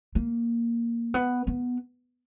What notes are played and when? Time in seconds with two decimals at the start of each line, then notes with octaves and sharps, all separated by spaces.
0.15 A#3
1.14 B3
1.47 B3